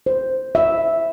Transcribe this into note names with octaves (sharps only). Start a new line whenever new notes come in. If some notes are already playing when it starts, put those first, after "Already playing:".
C5
E5